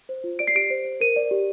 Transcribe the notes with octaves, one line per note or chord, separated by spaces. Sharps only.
C5
F4
D5 D7
C7
G4 D7
C5
C5
A#4 D#7
D5
G4